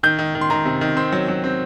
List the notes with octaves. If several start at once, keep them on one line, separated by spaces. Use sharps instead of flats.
D#3 G6
D#3
D#3
C6
D#3 A#5
C3
D#3
C4 C6
F#3
F#3
C4